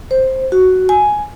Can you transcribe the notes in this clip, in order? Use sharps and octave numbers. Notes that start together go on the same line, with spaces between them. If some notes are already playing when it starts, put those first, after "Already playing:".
C5
F#4
G#5